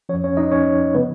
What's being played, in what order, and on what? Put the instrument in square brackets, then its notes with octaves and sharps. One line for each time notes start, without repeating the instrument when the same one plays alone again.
[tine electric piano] F3 C#4 C#5
F2
C#4 C#5
D#4 D#5
C#4 C#5
C#3 F3 B3 B4